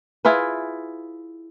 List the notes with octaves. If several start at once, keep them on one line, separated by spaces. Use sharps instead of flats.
E4 F4 G#4 B4